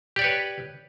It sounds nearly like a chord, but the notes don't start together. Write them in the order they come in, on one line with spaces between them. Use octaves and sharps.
G4 D5 C#5 B4